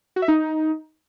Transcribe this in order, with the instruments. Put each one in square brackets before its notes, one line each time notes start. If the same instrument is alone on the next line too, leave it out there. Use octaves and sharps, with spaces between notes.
[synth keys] F#4
E5
D#4